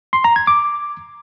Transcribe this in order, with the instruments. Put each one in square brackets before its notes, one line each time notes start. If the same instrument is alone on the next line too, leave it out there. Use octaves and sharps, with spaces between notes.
[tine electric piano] C6
A#5
G#6
D6